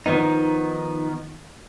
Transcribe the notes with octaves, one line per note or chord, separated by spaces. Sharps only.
D#3 F3 B3 D#4